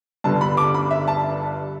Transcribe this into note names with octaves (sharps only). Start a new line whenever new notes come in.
G1 G2 D3 A5
B5
D6
B5
E5
A5